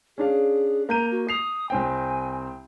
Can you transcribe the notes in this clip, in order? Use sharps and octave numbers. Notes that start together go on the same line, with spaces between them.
C#4 D4 G#4 F5
A#3 A#5 G6 D#7
F#4
D#6 C7 F7
C2 C4 G5 G#5